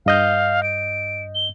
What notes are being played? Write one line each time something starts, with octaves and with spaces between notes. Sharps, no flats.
G2 D#5 F5 G6
D7
G7